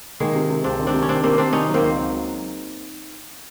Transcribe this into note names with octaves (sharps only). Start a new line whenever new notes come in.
D#3 G#3 A#3
C3
C3
C#2 C4 D4
D#3
C4 D4
C3
C#4
D#3 C4 D4
C3 A#3 C4
C3 C4 D4
D#3 C#4 D#4
F#3
A#3 C4
C#2
F#3